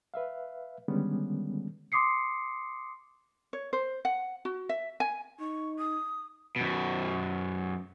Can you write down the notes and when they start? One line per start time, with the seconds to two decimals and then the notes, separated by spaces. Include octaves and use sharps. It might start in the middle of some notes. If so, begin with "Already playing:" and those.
0.14 B4 E5 F5
0.88 D3 D#3 G3 G#3 B3 C#4
1.92 C6 D6 D#6 C7 C#7
3.53 C#5
3.73 C5
4.05 F#5
4.45 F#4
4.69 E5
5.00 G#5
5.40 D#4 C#6
5.79 D#6
6.56 F#2 B2